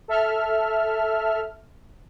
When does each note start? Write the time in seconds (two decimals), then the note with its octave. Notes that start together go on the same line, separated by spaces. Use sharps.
0.08 A4 E5 F6